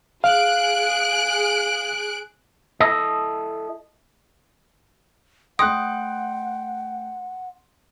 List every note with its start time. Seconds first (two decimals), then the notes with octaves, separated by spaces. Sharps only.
0.24 G#4 F5 F#6 D7
2.80 E4 A4 D#5
5.59 A3 F#5 G5 C6 D#6 F#6 D7